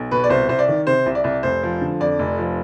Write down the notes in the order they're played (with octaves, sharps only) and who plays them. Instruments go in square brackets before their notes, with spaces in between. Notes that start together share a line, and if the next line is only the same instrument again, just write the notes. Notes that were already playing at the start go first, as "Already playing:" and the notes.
Already playing: [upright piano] B1
B2 B4
D5
C2 C5
C2 C5
D5
D#3
C3 C5
C2
D5
C2
F1 C5
F3
D3
F2 D5
F1
F3